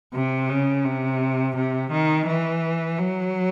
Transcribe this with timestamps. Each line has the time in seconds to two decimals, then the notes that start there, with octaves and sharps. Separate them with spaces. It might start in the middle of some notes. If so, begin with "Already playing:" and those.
0.14 C3
0.49 C#3
0.85 C3
1.57 C3
1.91 D#3
2.27 E3
2.99 F#3